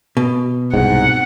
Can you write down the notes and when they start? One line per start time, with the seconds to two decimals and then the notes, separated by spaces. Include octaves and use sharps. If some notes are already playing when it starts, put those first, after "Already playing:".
0.17 B2
0.74 C2 G#2 F#5